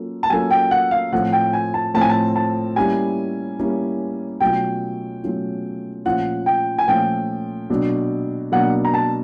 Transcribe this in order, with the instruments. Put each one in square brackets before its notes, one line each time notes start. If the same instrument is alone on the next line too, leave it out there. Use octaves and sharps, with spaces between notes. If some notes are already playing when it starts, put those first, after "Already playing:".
Already playing: [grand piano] F#3 A#3 C#4 F4 A4
[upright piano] A5
[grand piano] F#3 A#3 C#4 F4 A4 [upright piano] G#5
[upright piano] G5
F#5
F5
[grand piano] A2 F3 A3 C4 [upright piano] F#5
[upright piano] G5
G#5
A5
[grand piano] A2 F3 A3 C4 [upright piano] A5
[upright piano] G#5
A5
A5
[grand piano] G3 A#3 C#4 E4 [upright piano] G#5
[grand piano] G3 A#3 C#4 E4
[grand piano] B2 F#3 A3 C#4 F4 [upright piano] G5
[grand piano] B2 F#3 A3 C#4 F4
[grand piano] A#2 F3 A3 C#4 F4 [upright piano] F#5
[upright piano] G5
G#5
[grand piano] A#2 F3 A3 C#4 F4 [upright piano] G5
[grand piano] B2 F#3 A#3 D4
[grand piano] B2 F#3 A#3 D4 [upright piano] F#5
[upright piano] A#5
A5